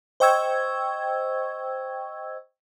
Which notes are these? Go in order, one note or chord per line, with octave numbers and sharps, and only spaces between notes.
C5 D#5 G5 C#6 E6 G#6